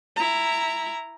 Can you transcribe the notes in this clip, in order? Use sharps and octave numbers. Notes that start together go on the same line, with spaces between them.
E4 A#5